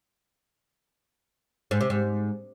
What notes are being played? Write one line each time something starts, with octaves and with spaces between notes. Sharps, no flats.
G#2
C3
G#2